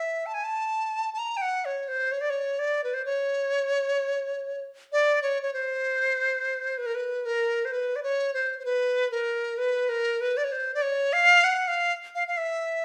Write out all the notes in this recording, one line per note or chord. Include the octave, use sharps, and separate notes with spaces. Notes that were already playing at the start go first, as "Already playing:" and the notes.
Already playing: E5
A5
G#5
A5
A5
A#5
G5
F#5
C#5
C5
C#5
D5
C#5
D5
B4
C5
C#5
D5
C#5
C#5
C5
B4
A#4
B4
A#4
C5
B4
D5
C#5
C5
C5
B4
A#4
B4
A#4
B4
D5
C#5
C5
D5
C#5
F5
F#5
F5
F5
F5
E5